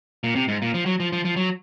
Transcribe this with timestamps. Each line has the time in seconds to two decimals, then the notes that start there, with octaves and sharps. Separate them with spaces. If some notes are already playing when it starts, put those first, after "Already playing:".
0.24 A#2
0.36 C3
0.48 G#2
0.62 A#2
0.74 F3
0.86 F#3
1.00 F3
1.12 F3
1.25 F3
1.36 F#3